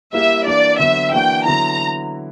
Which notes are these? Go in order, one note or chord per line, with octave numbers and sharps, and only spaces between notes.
G3 A#3 E4 G4 E5
E3 A#3 D4 D5
D3 F#3 B3 E5
E3 A#3 D4 F#4 G5
D3 F#3 B3 E4 A#5